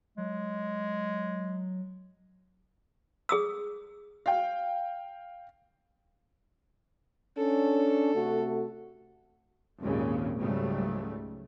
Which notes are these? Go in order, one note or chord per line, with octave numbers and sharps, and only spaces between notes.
F#3 G#3
G#4 D#6 E6
F5 G5
C#4 D4 A4
C3 A3 F#4
G#1 D#2 A#2 C#3
C#2 G#2 C#3 F#3 G3 A3